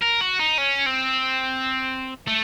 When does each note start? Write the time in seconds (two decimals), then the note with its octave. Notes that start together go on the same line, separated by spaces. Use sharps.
0.02 A#4
0.21 F#4
0.39 D#4
0.58 C#4
0.86 C4
2.28 A3